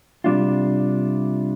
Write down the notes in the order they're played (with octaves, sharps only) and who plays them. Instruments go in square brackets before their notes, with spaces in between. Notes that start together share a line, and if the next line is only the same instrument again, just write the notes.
[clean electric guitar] C3 G3 D4 F4